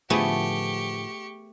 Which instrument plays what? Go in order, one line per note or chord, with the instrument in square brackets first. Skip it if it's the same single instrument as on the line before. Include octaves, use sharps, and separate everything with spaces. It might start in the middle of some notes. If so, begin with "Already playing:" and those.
[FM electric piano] A2 D3 F3 [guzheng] A3 B3 G#4 [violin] G4 C#6